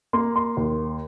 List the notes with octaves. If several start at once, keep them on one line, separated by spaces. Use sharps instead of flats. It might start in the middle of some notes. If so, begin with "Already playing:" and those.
A#3 C6
C6
D#2